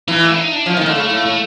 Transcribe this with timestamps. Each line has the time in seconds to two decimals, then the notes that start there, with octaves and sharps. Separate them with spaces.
0.08 E3 D#4
0.22 A3
0.37 D#4
0.52 D4
0.66 F3 C#4
0.77 D#3
0.81 A3
0.86 D3
0.95 C#3
1.10 A2
1.26 A3